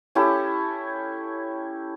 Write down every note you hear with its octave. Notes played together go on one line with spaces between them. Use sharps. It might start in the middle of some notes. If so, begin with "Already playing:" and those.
C#4 E4 G4 A4